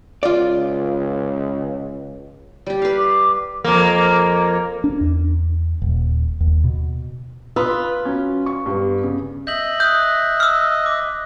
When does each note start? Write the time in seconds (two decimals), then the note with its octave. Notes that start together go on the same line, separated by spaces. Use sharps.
0.23 C#2 F4 D5
2.66 G3 G4
2.82 B4 F5
2.97 D6
3.64 F2 A#3
4.84 D4
5.01 E2
5.82 D#1
6.41 D#2
6.64 B2
7.56 F4 B4 B5 D#6 E6
8.05 F#3 C#4
8.46 C#6
8.66 G2 G3 B3
9.03 C#3
9.47 D#5 E5 G6 F#7
9.80 D#6 F#6 G6
10.40 E6 F6
10.86 D6